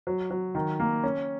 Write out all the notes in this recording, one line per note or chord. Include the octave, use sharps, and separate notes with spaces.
F#3
F#3
D#3
A#3
C#4